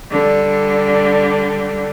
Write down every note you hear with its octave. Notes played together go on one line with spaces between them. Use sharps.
D3 G3